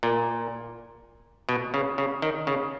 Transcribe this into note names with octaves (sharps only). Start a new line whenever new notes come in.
A#2
B2
C#3
C#3
D#3
C#3